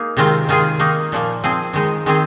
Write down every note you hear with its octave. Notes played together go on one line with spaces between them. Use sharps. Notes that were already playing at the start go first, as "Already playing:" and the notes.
Already playing: A#3 D#4 G#4
C3 D#3 G#3 C4 F4
D#3 G#3 F4 G#4
D#3 A#3 D#4
A#2 F3 A#3
F3 C4 G#4
D#3 G#3 D#4
D#3 G#3 C4 G#4